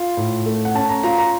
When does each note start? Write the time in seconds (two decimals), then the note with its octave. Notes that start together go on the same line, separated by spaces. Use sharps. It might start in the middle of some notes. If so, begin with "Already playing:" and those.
Already playing: F4
0.17 A2
0.46 A3
0.65 F#5
0.75 C#4 A5
0.89 A#5
1.03 F4 A#5
1.18 A#5